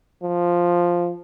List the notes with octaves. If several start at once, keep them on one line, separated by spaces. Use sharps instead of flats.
F3